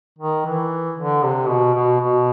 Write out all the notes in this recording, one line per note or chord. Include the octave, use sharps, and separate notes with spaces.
D#3
E3
D3
C3
B2
B2
B2